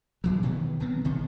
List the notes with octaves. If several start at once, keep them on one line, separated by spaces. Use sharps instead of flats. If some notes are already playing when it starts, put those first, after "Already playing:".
A#2 E3 F#3
B2 D#3 E3 B3
B1 D#3 B3 C4
G1 C3 D#3